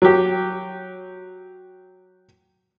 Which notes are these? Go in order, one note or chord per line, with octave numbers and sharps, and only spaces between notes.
F#3 G4